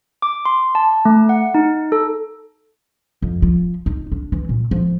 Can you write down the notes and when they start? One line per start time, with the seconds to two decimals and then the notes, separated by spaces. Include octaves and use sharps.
0.22 D6
0.45 C6
0.75 A5
1.05 A3
1.29 F#5
1.54 D#4
1.92 A4
3.22 F2
3.42 F3
3.86 D#4
4.12 D4
4.32 E3
4.49 A#2
4.71 F3